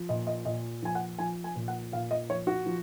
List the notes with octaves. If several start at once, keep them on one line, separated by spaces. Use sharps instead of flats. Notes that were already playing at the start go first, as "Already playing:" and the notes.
Already playing: F3
A#2 D#5
D#5
A#2 D#5
F3 G#5
F#5
F3 G#5
G#5
A#2
F#5
A#2 F5
D#5
F3 C#5
F#4
F3